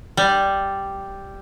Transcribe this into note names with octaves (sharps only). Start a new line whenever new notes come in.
G3